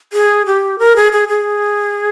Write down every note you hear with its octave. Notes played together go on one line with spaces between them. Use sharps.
G#4
G4
A#4
G#4
G#4
G#4